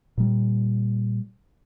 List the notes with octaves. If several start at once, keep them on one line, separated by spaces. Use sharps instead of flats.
A#2 G3